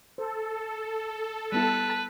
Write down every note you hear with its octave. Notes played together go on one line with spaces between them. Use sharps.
A4 C5
G3 B3 E4 B4 A5